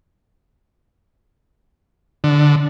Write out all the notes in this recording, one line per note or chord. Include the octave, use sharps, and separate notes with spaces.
D3